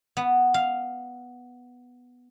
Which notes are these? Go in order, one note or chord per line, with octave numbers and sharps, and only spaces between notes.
B3
F5